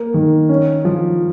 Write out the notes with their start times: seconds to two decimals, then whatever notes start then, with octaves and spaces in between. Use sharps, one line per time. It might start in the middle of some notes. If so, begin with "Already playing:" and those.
Already playing: A#3
0.14 D#3
0.49 C#4
0.85 F3